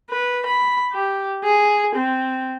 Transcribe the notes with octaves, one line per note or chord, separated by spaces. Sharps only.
B4
B5
G4
G#4
C4